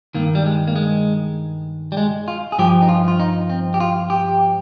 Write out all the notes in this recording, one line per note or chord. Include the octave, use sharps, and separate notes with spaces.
G2 D#3 A#3
G3
G#3
A#3
G#3
G3
G#3
F4
G#4
G2 F3 G4
D#4
F4
F4
D#4
C4
G4
F4
G4